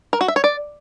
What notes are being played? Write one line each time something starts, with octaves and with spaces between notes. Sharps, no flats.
A#4
F#4
E5
C#5
D5